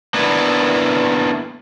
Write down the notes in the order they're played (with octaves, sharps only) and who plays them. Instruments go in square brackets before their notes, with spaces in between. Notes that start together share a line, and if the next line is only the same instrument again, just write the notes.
[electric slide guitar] A#3 B3 D4 E4 B4